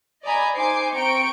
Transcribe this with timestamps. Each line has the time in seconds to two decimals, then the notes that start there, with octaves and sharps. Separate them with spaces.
0.24 D5 D#5 G#5 A#5 B5 D#6
0.55 D#4 C5 G#5 D6 C7
0.95 C4 G5 A#5 C#6 D7